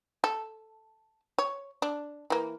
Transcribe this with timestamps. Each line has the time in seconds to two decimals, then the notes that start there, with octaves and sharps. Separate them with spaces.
0.24 A4
1.38 C#5
1.82 D4
2.30 E3 A#3